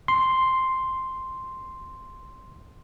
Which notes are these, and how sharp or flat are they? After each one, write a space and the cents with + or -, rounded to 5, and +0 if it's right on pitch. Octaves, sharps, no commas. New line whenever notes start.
C6 +0